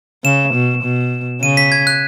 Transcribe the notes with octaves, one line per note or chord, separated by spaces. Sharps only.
C#3 E7
B2
B2
C#3 D#7
B6
G#6
F#6